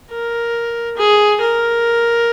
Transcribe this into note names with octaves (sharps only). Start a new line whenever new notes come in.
A#4
G#4
A#4